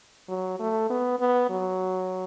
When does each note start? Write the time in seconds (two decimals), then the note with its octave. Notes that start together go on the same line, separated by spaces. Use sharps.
0.29 F#3
0.59 A3
0.90 B3
1.19 B3
1.50 F#3